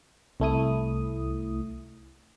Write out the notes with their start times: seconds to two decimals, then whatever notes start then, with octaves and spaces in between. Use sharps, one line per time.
0.40 C2 A3 E4 D#6